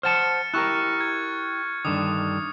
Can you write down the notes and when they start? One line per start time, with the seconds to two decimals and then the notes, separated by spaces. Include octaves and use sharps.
0.03 C5 F#5 A5 F6 A6 C#7
0.54 E4 G4 A#4 C#6 F#6
1.01 G#6
1.85 G2 D3 D#3 D#6